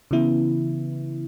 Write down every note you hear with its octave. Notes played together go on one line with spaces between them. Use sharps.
C#3 E3 B3 E4